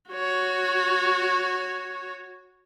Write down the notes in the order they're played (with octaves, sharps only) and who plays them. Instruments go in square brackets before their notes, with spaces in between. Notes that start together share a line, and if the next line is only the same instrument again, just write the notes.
[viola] F#4 C#5